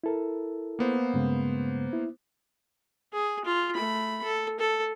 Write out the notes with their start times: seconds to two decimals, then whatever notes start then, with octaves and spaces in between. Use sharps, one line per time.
0.04 E4 A4 A#4
0.79 A#3 B3 C5
1.14 G2 C#3 G#3
1.93 E4
3.13 G#4
3.45 F4
3.75 A3 B5
4.24 A4
4.60 A4